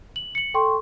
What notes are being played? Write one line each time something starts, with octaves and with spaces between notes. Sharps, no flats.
F#7
C#7 F#7
A4 G5 C6 C#6